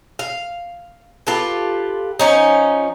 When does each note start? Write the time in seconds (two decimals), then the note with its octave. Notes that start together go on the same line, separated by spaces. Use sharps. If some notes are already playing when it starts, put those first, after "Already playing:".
0.19 F5
1.27 F4 G4 A4 B4
2.19 F3 C#4 D#4